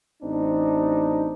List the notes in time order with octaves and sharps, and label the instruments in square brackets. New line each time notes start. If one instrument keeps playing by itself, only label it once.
[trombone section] A1 C4 D4 D#4